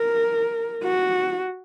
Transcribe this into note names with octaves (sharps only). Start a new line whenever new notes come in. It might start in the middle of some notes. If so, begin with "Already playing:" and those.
Already playing: A#4
F#4